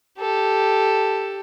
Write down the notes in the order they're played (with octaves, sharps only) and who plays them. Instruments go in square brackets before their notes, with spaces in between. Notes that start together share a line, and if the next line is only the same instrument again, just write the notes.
[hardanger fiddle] G4 A4